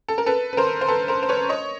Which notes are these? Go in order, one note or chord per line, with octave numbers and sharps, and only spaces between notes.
A4
A#4
A4 B4
B4
A#4 C5
C5
A4 B4
A#4 C5
C5
B4 C#5
C#5 D#5